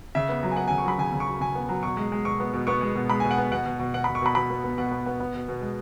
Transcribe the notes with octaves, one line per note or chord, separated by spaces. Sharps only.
C#3 E5
B3
F#3
G#5
B3 F#5
C#3 G#5
C#6
F#3 B5
C#3 G#5
C#3
C#6
F#3
C#3 G#5
B3
F#3
B2 C#6
G#3
G#3
B2 C#6
B3
B2
B3 C#6
G#3
B2
G#3 B5
B2 G#5
F#5
B3
B2 F#5
B2
B2
B2 F#5
B2 B5
C#6
B2 B5
B2 B5
B3
B3
B2 F#5
B3
B3
B3
B2
B2
G#3